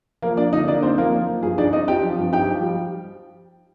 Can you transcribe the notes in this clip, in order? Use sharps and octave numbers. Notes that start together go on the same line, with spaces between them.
F3 A#3 A#4
A#3 D4 D5
D3 D#4 D#5
A#3 D4 D5
C4 D#4 C5
F3 A#3 A#4
A#3
F3
G2 G#4
D4 D#4 D5
C4 D#4 D#5
C4 G4 G5
F3
G2
D#4 G4 G5
F3
G3